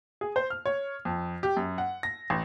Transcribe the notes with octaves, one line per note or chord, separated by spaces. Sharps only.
G#4
C5
F6
C#5
F2
G4
F#2
F#5
A#6
A1